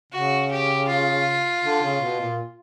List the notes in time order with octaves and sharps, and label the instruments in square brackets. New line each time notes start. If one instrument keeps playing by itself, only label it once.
[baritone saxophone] C#3 [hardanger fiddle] F#4
[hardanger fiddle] G4
F4
[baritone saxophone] D3
C#3
B2
A#2